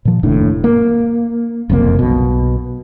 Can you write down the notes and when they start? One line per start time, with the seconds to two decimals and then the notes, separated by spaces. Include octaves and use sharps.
0.05 A#2 F3
0.23 F1 D#2 A2 D4
0.64 A#3
1.69 F#1 C2 F2 A#3
1.99 B1 B2